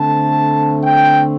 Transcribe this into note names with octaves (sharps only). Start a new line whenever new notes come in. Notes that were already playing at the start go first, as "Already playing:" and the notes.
Already playing: D3 A3 C4 A5
G5